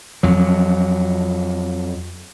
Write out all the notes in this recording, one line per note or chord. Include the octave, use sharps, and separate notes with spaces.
F2 F#3